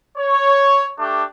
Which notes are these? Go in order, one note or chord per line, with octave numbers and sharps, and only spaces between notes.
C#5
A3 D4 G4